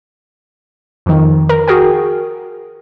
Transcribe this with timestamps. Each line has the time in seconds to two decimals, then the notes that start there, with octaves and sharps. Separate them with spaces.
1.06 F2 D#3
1.49 A#4
1.68 F#4 G#4 A#4 G5